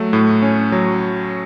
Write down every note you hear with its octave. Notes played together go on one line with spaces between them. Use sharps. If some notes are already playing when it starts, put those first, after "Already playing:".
Already playing: F#3 A3
A2
C#4
F#3